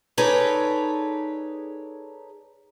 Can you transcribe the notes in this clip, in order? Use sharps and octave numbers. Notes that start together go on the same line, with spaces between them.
D#4 G#4 A4 B4 C#5 D5